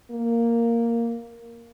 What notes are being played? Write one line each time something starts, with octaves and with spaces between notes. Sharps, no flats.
A#3